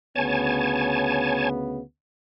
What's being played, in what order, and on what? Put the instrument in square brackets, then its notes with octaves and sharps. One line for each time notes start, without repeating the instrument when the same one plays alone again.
[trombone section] D2 C#3 B3 [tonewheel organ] C#5 G#5 A5